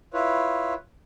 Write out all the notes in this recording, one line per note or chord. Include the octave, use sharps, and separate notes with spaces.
E4 F4 B4 C#5